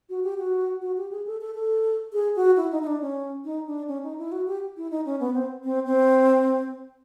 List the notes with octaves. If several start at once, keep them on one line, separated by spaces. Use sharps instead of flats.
F#4
G4
F#4
F#4
G4
G#4
A4
A4
A4
G#4
F#4
E4
D#4
D#4
D4
C#4
D#4
D4
C#4
D#4
E4
F#4
G4
E4
D#4
C#4
B3
C4
C4
C4